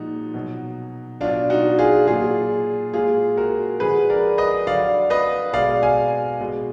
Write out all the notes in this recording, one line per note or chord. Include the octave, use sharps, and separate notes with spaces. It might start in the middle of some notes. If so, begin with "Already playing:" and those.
Already playing: A#2 F3 G#3 D#4 F#4
B2 F#3
B2 F#3 D4 F4
D#4 F#4
F4 G#4
A#2 F#3 F4 G#4
A#2 G#3 F4 G#4
F#4 A#4
D3 F3 G#3 G#4 B4
A#4 D5
B4 D#5
D3 F#3 D5 F5
B4 D#5
B2 G#3 D5 F5
F5 G#5
B2 G#3